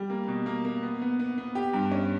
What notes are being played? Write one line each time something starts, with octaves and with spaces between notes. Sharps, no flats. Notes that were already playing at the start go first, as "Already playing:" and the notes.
Already playing: G3
A#3
B2
A#3
A#3
B3
B3
B3
B3
G4
G2
C#4